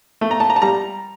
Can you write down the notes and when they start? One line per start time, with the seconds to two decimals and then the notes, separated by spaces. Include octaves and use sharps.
0.21 A3
0.31 A#5
0.40 A5
0.50 A#5
0.56 A5
0.62 G3 A#5